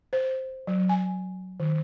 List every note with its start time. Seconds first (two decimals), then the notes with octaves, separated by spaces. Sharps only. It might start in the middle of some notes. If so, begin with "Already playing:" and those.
0.13 C5
0.67 F#3
0.89 G#5
1.60 D#3